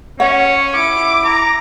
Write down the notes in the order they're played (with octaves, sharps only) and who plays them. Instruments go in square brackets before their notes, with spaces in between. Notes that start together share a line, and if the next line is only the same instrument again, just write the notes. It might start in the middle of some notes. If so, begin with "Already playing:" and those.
[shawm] C#4 [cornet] C#5 [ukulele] F#5
[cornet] E4 [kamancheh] D6
[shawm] A#5